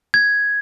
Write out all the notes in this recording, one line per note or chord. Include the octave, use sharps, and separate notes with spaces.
G#6